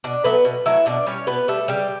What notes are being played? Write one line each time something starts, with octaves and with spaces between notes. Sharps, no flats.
B2 D4 D5
F#3 A3 B3 B4
B2
F#3 A3 E4 E5
B2 D4 D5
G3 C#4 C#5
B2 B3 B4
G3 A3 A4
C#3 G3 G4